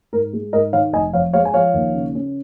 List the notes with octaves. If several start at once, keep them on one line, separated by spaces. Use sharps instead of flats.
G#2 A#4
G#3
G#2 A#4 D#5
D#3 C#5 F5
F1 D#5 G#5
F2 C#5 F5
G#3 C#5 F5
G#5
F3 C#5 F5
D#2
C#3
C#4